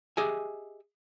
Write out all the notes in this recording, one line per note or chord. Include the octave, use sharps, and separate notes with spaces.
G4 G#4 D#5 E5 G#5